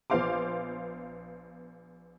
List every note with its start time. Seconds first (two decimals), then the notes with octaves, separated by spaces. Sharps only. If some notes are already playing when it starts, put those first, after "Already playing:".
0.10 A#1 B3 C5 F5 C6 D6